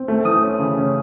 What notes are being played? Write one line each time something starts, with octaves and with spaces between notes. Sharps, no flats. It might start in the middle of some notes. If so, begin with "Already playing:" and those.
Already playing: C4
A3
E3 D#6
C#4
C#3
C#4